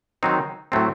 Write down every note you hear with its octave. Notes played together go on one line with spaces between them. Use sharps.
D#3 F#3 C4 D#4
A2 F#3 A3 C4